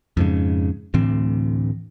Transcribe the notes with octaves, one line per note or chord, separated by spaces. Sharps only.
F2 G#2 C#3
D2 A2 E3 C4